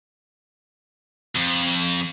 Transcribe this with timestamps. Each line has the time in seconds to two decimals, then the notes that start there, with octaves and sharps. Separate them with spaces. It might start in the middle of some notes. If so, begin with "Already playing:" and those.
1.35 F2